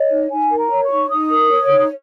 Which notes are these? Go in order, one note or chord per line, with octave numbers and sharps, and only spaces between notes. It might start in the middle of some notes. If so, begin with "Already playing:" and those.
Already playing: C#5 D#5
D#4
D#4 G#5
A#4
A#5
C#5
C#6
D#4
D#4 D#6
A#4
C#5
D#4